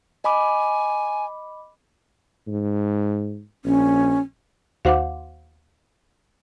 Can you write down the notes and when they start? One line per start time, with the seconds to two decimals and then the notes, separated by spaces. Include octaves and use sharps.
0.24 D#5 G#5 B5 D6
2.47 G#2
3.65 A#1 C#4
4.85 D#2 F#4 C5 F5 F#5 D6